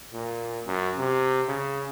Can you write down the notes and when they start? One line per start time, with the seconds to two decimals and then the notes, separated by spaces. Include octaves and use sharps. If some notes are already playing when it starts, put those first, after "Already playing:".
0.13 A#2
0.66 F#2
0.99 C3
1.48 C#3